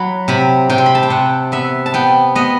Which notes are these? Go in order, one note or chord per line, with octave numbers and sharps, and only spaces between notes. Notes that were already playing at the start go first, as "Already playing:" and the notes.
Already playing: F#3 B5
C3 B5
C3 G5
C6
B5
A5
G5
C3 F#5
B3 E5
A5
B3 G5
B3 D#5